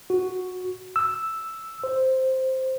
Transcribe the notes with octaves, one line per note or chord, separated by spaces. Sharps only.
F#4
E6
C5